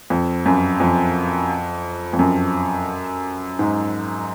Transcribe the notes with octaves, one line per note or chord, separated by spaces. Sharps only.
F2
F#2
F2
F2
F#2
G#2